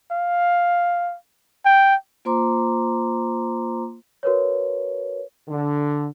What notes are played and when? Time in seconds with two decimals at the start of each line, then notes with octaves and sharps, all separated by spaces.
0.12 F5
1.65 G5
2.25 A#3 F4 C5 A#5 C6 D6
4.23 F#4 A#4 B4 C#5
5.48 D3